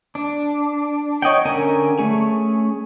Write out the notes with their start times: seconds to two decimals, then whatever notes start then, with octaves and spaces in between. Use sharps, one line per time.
0.15 D4
1.22 C#5 D#5 F#5 G5
1.45 D3 C#4 A#4 G#5
1.98 A3 C#4 G#4